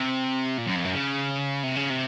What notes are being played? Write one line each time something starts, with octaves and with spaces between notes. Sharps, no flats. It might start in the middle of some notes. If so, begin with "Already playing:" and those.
Already playing: C3
A#2
F#2
F2
F#2
C#3
C3
C#3
C3